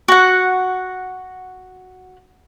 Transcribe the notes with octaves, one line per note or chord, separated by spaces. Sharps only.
F#4 F#5